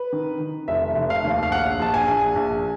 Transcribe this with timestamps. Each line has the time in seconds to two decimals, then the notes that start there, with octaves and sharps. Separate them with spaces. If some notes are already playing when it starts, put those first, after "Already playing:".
Already playing: B4
0.12 D#3
0.40 D#3
0.68 F1 E5
0.95 F1
1.10 F5
1.24 D#2
1.43 F5
1.51 A#1 F#5
1.80 A#1 A5
1.94 G#5
2.07 A#1
2.36 A#1